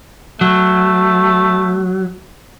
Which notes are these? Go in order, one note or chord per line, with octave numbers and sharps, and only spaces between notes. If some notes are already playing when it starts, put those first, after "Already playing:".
F#3 A3